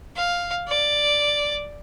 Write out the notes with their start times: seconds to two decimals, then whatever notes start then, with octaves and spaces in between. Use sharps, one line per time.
0.16 F5
0.69 D5